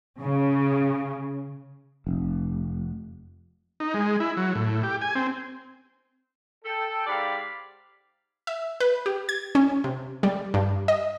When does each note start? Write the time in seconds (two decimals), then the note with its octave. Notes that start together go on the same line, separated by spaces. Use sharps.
0.21 C#3
2.07 F1
3.80 D#4
3.94 G#3
4.20 E4
4.37 F#3
4.55 A2
4.83 G4
5.01 G#5
5.15 C4
6.65 A4 G5
7.07 G#2 G4 D5 F5 B5
8.47 E5
8.80 B4
9.06 G4
9.29 G#6
9.55 C#4
9.84 C3
10.23 G3
10.54 G2
10.88 D#5